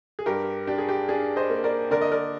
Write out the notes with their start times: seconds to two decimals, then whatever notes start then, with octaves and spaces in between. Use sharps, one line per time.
0.19 G#4
0.26 G2 G4 A#4
0.67 D4 G4
0.78 G#4
0.89 G4
1.09 D4 G#4
1.36 C5 D#5
1.50 A#3
1.64 A#4 D5
1.91 D3 A#4 D5
2.01 D#5
2.12 A#4 D5